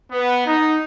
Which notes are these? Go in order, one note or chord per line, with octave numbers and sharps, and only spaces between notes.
B3
D#4